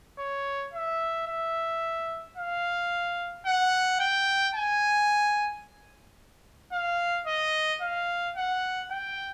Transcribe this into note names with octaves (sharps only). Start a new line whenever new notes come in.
C#5
E5
E5
F5
F#5
G5
G#5
F5
D#5
F5
F#5
G5